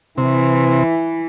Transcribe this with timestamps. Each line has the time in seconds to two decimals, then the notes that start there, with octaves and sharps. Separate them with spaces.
0.18 C3 E3